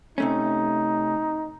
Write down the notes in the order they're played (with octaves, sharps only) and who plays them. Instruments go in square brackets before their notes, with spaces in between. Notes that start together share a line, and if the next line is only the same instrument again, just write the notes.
[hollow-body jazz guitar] C3 A3 C#4 [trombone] D#4